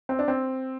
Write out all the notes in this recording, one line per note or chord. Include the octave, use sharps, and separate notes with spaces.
C4
D4
C4